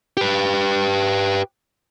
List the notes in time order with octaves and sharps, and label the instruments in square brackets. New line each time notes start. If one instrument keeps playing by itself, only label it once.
[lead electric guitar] G4 B4